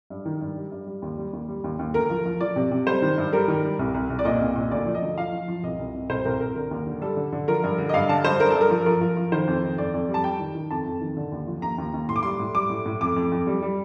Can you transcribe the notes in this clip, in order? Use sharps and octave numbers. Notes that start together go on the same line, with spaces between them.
G2
D#3
G2
G3
G2
G3
D#2
G3
D#2
G3
D#2
D#2
D2 A#4
F3
F3
F3 D5
C3
C3
G3 C5
D#3
G2
G3 A#4
D#3
G3
C2
C2
C2
D5
A#2 D#5
C2
A#2
D2 D5
F3
D#5
D2
F3 F5
F3
F3
C2 D#5
C2
C2
C2 C5
C2 A#4
C2 A#4
D3 A#4
D#2
D3
G3 A4
D3
D3
F3 A#4
G2
D3
D#5
G2 F5
D3 A5
G2 C5
G2 A#4
A4
G2
A#4
F3
F3 A#4
F3
F3
D#3 C5
F2
D#3
F2 D5
F2
G3
A5
G3 G5
D#3
D#3
F2 A5
F2
D#3
D3
D#2
F3
D#2 A#5
D#2
D#2
A2 C6
D6
G3 C6
A2
G3 D6
A2
A2
F2 D6
F2
F2
G3
G3